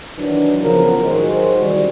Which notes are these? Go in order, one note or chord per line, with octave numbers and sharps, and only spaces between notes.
D#3 E3 F#3 D4
C#3 E3 F3 B3 G#4 A#4
A1 D#3 F#3 G#3 F#4 C5
C2 F#2 D#3 G3